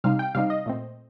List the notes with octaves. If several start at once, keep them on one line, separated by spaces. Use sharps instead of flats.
C3 G3 C4 D#4 F5
G5
C3 G3 C4 D#4 F5
D#5
A#2 A3 C4